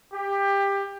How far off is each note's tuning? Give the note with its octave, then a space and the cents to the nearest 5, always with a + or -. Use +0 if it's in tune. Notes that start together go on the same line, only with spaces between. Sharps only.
G4 +20